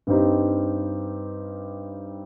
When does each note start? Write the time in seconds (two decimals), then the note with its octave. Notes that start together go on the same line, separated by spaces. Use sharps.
0.07 G2 G3 C4 D#4 G4